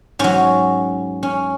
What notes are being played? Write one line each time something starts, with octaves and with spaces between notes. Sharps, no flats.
G#2 F#3 C#4
C#4